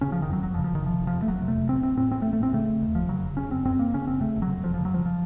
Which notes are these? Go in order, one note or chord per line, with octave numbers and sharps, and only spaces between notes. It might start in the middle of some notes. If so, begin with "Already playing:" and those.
C#3 C#4
F#1 F3
D#3
F2 F#3
F#1 F#3
F3
C#3
F3
F#1 D#3
C3 F3
F1
F3
F2
A3
F1 F#3
C3
A3
F1
A1 C4
A2 C4
A2 C4
A1 C4
A3
A1
A3
A2 C4
C#3 A3
F1
D#2
F1 F3
C#3 F#3
F1
C#3 C#4
F#1 C4
F#2 C4
F#1 A#3
C#3 C#4
F#1 C4
C#3 A3
F1
F#3
F2
F1 F3
C#3 F3
F#3
F1 F3
F3